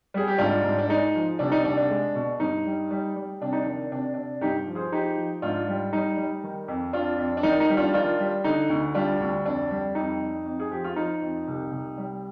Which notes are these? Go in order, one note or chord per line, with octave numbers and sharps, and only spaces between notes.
G3 G#4
G4
G#2 D4 F4
G#2
D4
G#3 D#4
F3
C2 D4
D#4
C2 D4
D4
G#3
B2
G2 D#4
G3
G3
G3
C3 D4
D#4
D#3 D4
C3 D4
C3 D4
G2 D#4 G4
F3
G#4 C5
F3 D#4 G4
F3
G#2 D4 F4
G3
G3 D#4
G3
D#3
F2
F2 D4 F4
F2
D4
D#3 D#4
D#4
G3
D4 F4
D#3 D4 F4
G3
D3 D#4
D2
G3 D4 F4
D2
F2 D4
G3
F2 D#4
F2
F2
G#4
F3 G4
F4
F3 D#4
F2
C2
C2
G3